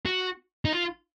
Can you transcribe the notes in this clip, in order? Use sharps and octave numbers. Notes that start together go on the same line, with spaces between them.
F#4
D#4
F4